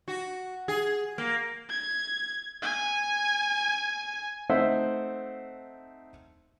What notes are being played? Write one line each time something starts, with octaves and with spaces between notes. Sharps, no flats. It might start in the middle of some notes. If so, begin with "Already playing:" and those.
F#4
G#4
A#3
G#6
G#5
A3 C4 D#4 C5 E5 F#5